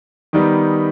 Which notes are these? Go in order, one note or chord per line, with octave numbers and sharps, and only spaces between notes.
D#3 G3 B3 D#4